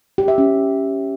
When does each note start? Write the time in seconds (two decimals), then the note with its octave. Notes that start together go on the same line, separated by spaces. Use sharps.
0.18 G4
0.28 E5
0.38 C#4